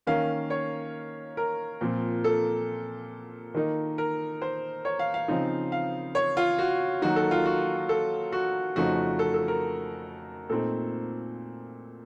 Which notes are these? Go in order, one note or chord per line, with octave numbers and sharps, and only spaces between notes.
D#3 A#3 C#4 F5
C#5
A#4
A#2 F3 C4
A4
D#3 A#3 D#4
A#4
C5
C#5
F5
F5
C#3 F3 C4 D#4
F5
C#5
F4
F#4
D#3 F#3 A#3 D#4 F#4
A4
F4
F#4
A4
F#4
F2 C#3 F3 A3 D#4 F#4
A4
A4
A#4
A#2 A3 C4 D#4 A4